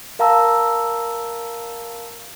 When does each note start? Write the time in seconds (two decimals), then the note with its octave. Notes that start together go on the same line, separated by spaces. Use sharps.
0.19 A#4 F5 A5 A#5 E6